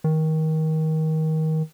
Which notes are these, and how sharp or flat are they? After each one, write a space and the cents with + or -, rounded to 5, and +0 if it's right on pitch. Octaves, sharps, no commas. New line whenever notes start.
D#3 +25